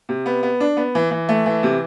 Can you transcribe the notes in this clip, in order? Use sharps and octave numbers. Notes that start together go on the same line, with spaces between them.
C3
B3
B3
D4
B3
E3
E3
A3
E3
C3